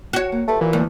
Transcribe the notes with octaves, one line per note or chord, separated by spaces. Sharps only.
F#4 C#5
A#3
A3 F4 G4 B4
A#2 E3
D2 F#3 G#3 A#3